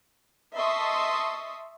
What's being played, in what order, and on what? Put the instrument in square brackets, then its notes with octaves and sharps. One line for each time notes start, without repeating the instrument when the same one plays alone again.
[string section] D#5 E5 A5 C6 C#6 D#6